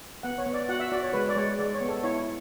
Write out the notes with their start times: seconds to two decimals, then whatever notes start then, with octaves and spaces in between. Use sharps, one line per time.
0.23 B3 F#5
0.38 C#5
0.46 B3
0.54 D5
0.69 F#4 F#5
0.79 E5
0.92 F#4 D5
1.03 C#5
1.13 G#3 B4
1.29 D5
1.36 G#3 C#5
1.59 G#3 D5
1.74 C#5
1.81 B3
1.88 A4
2.04 E4 C#5